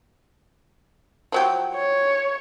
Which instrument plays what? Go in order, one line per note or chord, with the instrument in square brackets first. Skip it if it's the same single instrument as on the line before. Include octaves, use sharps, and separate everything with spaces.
[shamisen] F3 F#3 G4
[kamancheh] C#5